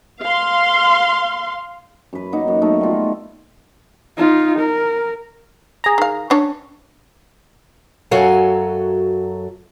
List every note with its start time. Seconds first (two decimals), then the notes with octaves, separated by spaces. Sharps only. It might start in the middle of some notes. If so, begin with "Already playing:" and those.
0.23 F5 C6
2.13 F#2 B4
2.32 A#3 D#4 F#5
2.48 F#2
2.61 F#3 A3 B3 D#4
2.81 G3 F4
4.17 D#4 F4
4.59 A#4
5.84 G#4 A#5
5.98 D#3 F5
6.30 C#4 D4 C#5
8.11 F#2 F#3 F#4 A4 F5 G#5